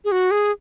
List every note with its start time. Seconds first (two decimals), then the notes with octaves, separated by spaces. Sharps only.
0.05 G#4
0.12 F#4
0.31 G#4